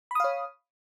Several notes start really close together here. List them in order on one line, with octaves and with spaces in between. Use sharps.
B5 D#6 F5 C#5